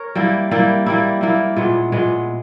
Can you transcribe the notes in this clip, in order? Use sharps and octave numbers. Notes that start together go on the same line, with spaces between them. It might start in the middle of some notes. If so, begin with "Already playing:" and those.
Already playing: A#4 C#5
G3 A#3 E4
G3 A#3 E4
G3 A#3 E4
G3 A#3 E4
A#2 G#3 B3
A#2 G#3 B3